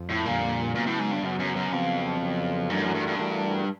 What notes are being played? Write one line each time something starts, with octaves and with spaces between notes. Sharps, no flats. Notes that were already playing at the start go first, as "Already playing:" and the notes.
Already playing: F2
A2
F2 A#2 D3 G3 A#3
A#2 C#3 F#3 B3
A2
G#2
G2
F#2 C#3 F#3 B3
F#2
F#2
F2 C#3 F#3 B3
C#3 F#3 B3
F#2 E3 A3 D4 F#4 A#4
G2
F#2
G2
G2
E3 A3 D4 F#4 A#4